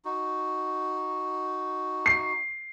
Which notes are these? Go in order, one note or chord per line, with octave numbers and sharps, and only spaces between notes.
D#4 F#4
C7